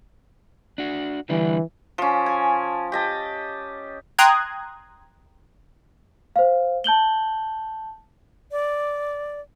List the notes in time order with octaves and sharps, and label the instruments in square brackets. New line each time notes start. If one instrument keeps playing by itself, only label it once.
[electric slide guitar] D4 F#4
[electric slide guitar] D3 G3 D4 [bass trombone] E3
[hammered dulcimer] F3 C#4
G#5
G4 D#5 A5
[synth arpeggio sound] G5 A#5 C6 D#6 F#6 G#6
[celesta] C5 F5
A5 G6 F#7 G7
[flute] D5